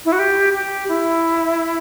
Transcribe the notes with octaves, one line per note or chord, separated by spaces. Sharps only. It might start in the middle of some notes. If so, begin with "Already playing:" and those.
E4
F#4
G4
G4
E4